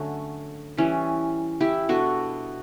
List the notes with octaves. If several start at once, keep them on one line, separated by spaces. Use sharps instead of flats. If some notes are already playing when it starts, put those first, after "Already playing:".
Already playing: D3 F#3 A3 C#4
E3 G3 C#4
E4 G4
B2 G3 D4 F#4 A4